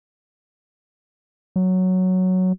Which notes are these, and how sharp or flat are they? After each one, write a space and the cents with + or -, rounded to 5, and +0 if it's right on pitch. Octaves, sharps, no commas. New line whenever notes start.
F#3 +0